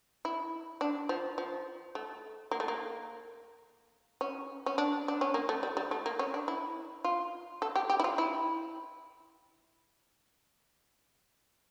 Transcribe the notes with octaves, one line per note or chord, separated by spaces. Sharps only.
E4
D4
F3
F3
A3
A#3
A3
A#3
C#4
C#4
D4
D4
C#4
A#3
A3
G3
G3
A3
A#3
C#4
D4
E4
F4
A4
G4
G4
E4
F4
E4